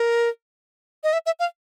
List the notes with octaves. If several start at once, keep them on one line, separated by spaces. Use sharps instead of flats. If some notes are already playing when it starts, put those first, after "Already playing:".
Already playing: A#4
D#5
E5
E5
F5